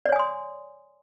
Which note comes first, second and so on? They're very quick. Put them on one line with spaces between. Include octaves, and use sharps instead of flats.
D5 C#5 G#5 D#6 C6